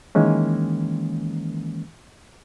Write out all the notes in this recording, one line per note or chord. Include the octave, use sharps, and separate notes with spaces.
D#3 E3 G#3 A#3 C#4